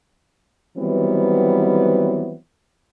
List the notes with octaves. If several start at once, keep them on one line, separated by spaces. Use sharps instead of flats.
D#3 E3 F#3 G3 B3 C4